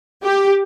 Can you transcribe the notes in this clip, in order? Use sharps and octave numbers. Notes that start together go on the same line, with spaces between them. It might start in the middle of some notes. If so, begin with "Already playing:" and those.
G4